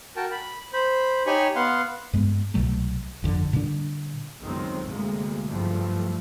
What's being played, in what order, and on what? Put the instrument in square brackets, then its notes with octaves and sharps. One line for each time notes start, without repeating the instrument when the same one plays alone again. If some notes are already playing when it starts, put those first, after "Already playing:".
[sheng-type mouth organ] F#4 A#4 G5 A5
B5
C5 B5
D#4 G4 C#5 G#5 B5 C#6
B3 F5 F#5 C6
[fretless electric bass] G2 G#3 B3
C2 B2 F#3 A3
G1 F2 D3
A#2 D3 G3 D4
[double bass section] G1 C#2 F#2 D#3 G#3 C4
D2 C3 G#3 A#3
F#1 G2 F3 G3 A3